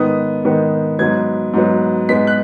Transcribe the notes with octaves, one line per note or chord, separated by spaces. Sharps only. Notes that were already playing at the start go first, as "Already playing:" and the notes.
Already playing: G#2 D#3 B3 D#6
G#2 D#3 B3
G#2 F#3 B3 G#6
G#2 F#3 B3
G#2 G#3 B3 B6
F#6